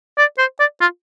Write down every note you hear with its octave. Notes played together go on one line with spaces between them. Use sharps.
D5
C5
D5
F4